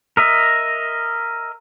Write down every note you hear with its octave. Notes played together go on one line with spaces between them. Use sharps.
A#4 D#5 E5